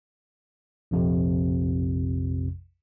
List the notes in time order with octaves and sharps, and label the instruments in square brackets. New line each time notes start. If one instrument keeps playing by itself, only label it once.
[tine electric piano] A#1 F2 C3